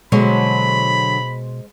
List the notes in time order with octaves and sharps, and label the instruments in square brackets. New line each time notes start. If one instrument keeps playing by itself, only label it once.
[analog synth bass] B2 [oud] D3 F#3 [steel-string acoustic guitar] G#3 C5 [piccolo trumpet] B5